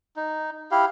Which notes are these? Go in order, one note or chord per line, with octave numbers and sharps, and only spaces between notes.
D#4
E4 G4 F5